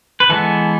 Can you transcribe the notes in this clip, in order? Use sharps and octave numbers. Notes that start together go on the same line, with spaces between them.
B4
E3 G#3 B3 A4